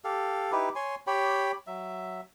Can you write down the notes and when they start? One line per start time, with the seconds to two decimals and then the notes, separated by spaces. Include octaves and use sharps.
0.04 G4 A4 F5
0.52 D#4 E4 G4 B4
0.76 C#5 G#5 C6
1.07 G4 C#5 G5 B5
1.67 F#3 E5